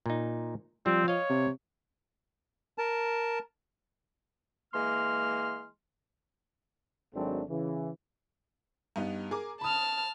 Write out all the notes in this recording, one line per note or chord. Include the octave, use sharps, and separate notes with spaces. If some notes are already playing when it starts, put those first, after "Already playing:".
A#2 D#4
F3 G3 C4
C#5 D#5 F5
C3
A#4 A5
E3 G#3 A#3 C6 F6
G#1 F#3 A3 C4 D4
C#3 E3
G2 B3 D#4
G#4 A#4 D6
A5 B5 D#6 F6